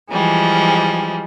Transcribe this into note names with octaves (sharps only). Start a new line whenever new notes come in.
E3 F3 G3 G#3